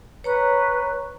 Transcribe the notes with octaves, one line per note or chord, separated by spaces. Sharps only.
B4 C#5 A#5 C#6